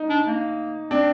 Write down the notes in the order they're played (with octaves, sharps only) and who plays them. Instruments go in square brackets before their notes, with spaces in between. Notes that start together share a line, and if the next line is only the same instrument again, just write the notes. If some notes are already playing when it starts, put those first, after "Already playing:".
Already playing: [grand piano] D#4
[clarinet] D4
A#3
[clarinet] C4 [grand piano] D4